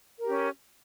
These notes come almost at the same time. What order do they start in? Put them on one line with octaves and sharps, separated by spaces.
A#4 G4 C#4